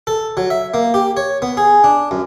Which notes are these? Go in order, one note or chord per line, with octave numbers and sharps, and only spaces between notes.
A4
F#3
E5
A#3
G4
C#5
B3
G#4
D4
F#2